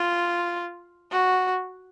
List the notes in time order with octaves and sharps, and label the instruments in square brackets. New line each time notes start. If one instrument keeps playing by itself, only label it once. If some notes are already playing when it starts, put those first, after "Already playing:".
Already playing: [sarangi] F4
F#4